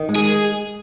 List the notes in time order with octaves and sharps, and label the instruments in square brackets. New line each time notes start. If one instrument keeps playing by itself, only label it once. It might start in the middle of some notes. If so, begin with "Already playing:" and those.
Already playing: [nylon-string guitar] D#3
G#3
[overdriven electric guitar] G#4